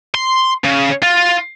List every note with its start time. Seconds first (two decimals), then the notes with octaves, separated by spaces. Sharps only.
0.15 C6
0.65 C#3
1.03 F4